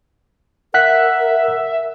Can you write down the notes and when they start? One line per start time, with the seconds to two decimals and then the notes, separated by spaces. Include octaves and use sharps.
0.74 A#4 E5 F#5 F#6 B6